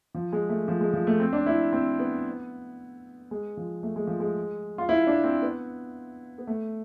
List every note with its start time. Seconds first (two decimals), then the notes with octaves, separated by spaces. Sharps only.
0.14 F3
0.32 G#3
0.49 A3
0.68 F3
0.81 G#3
0.94 F3
1.07 A3
1.20 C4
1.33 D4
1.46 E4
1.73 C4
1.99 B3
3.31 G#3
3.57 F3
3.83 A3
3.96 G#3
4.07 F3
4.20 G#3
4.78 F4
4.89 E4
5.07 D4
5.24 C4
5.42 B3
6.38 B3
6.47 A3